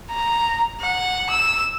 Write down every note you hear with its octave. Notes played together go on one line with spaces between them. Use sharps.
A#5
F#5
E6